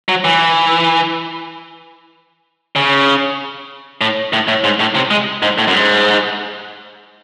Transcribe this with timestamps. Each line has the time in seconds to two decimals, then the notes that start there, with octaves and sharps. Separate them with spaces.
0.09 F#3
0.24 E3
2.76 C#3
4.01 A2
4.33 A2
4.48 A2
4.64 G#2
4.80 A2
4.95 C3
5.11 G#3
5.42 G#2
5.58 A2
5.68 F#2
5.74 G#2